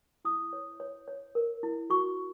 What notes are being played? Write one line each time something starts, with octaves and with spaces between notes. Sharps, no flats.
E4 D#6
C#5
C#5
C#5
A#4
E4
F#4 C#6